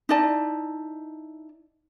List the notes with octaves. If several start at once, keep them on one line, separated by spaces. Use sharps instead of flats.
D#4 E4 D5 A5